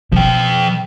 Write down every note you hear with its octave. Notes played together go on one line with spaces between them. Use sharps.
B2 F3 G5